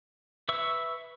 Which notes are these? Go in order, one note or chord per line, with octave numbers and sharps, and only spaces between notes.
B4 E5 C#6 E6